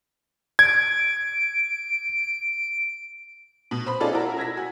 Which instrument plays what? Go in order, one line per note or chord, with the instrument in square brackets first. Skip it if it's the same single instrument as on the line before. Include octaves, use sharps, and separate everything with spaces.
[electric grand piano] G#6 [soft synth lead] D7
[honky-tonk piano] B2
C5 B5
C#4 D#4 F4 G#4 A4 D5
E4 F#4 A#4
E6 G#6 A#6 B6
F#4 G#5